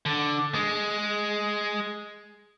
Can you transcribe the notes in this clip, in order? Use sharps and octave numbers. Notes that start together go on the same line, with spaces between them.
D3
G#3